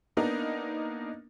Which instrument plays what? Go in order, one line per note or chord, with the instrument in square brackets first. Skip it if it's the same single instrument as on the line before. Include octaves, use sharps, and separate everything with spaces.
[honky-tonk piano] A#3 B3 D4 D#4 A#4